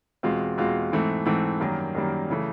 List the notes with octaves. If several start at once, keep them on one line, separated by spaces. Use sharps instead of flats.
E2 B2 G#3 C4 F4
E2 B2 G#3 C4 F4
G#2 E3 A3 C4
G#2 E3 A3 C4
F#2 D#3 G3 A#3
F#2 D#3 G3 A#3
C#3 E3 A3